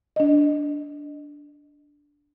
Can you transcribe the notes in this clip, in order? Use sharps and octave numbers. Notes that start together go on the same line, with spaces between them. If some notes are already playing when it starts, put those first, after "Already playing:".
D4 D#5